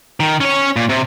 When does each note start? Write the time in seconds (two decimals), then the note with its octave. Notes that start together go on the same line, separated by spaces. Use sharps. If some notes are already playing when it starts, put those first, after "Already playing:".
0.20 D#3
0.40 C#4 C#5
0.76 A#2
0.89 C3